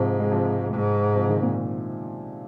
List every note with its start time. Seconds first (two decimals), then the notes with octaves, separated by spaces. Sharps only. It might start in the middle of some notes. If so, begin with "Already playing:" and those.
Already playing: G#2 C3 F3
0.20 G#3
0.31 C3 F3
0.73 G#2
1.15 C3 F3
1.29 D#3 G#3
1.43 A#2